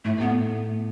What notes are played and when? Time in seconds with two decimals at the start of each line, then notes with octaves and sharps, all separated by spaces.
0.04 A2 A3
0.20 A3 B3